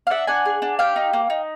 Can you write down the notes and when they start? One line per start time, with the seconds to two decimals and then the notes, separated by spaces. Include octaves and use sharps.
0.07 F5
0.10 D4 E5 F#5
0.27 D4 F#5 G#5
0.45 G#4
0.62 D4
0.79 G4 F5 G5
0.96 D#4
1.13 A#3
1.30 D#4